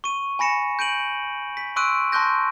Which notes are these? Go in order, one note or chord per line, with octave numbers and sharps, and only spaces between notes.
C#6 D#7
G#5 B5 A#6 C#7 E7
G6 D7 D#7 F#7
B6
C6 C#6 E6 F#6 D7 D#7
A5 C6 C#6 F#6 G6 A#6